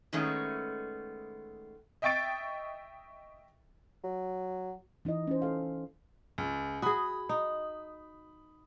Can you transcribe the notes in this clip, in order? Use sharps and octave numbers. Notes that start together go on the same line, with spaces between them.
D#3 G#3 A3 B3 C#4
D#5 E5 G5 C#6 A6 D7
F#3
E3 D#4 E4 D#5
C#4 C5
A4 F5
C#2
F#4 G#4 B5 D#6
D#4